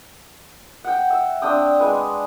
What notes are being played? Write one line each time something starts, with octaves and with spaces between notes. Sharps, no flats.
F#5 G5
E5
C4 D4 G5 D#6
G#3 B4 G#5